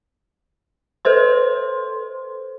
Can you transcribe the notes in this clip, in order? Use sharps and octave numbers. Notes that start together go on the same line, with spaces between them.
A4 B4 C5 C6